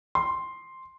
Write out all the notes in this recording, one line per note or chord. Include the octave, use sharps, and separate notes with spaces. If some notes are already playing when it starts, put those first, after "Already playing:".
C6